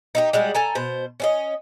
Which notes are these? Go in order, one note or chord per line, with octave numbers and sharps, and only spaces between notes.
D#4 E4 G4
G3 G#3 F#4
A4 G#5 A#5
B2 C5
C#4 D4 D#5